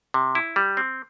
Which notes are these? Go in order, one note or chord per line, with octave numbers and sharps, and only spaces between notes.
C3
E4
G3
C4